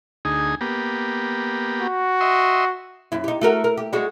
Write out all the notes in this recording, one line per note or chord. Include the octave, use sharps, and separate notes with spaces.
D2 D#4 G#4
A#3 B3 G4
F#4
D#5 E5 C6
F#2 E4
D#4 G4
A3 F#4 A#4
A#4
G4
G3 G#3 F#4